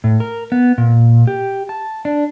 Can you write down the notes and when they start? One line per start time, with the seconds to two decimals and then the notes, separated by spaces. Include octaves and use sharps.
0.04 A2
0.20 A#4
0.52 B3
0.78 A#2
1.27 G4
1.69 A5
2.05 D4